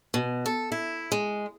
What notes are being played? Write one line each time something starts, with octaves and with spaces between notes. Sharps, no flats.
B2
A4
E4
G#3